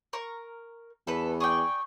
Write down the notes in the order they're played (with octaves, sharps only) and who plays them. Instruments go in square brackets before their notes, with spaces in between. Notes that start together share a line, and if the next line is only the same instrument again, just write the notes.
[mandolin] A#4 C#6
[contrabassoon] E2 [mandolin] A4 B4
[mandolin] G#4 D5 G5 [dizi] C#6